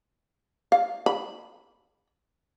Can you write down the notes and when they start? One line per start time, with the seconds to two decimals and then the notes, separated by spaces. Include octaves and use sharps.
0.72 F5
1.06 B5